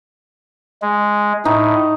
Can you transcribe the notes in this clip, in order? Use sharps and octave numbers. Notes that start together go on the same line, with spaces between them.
G#3
A2 D#4